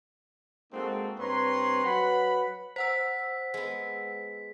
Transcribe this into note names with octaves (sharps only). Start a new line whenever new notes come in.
G#3 A#3 C4 D#4 F#4 A4
G2 C4 B4 C#5 A#5 C6
F#3 B4 F#5 B5
C5 F#5 E6 B6
G#3 B3